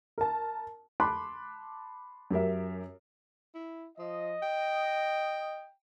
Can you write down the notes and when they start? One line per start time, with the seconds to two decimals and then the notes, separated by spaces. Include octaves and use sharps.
0.18 A#4 A5
1.00 A5 B5 C6 D6 F#6
2.31 F#2 G4 A#4 E5
3.55 E4
3.98 F3 D#5
4.43 G5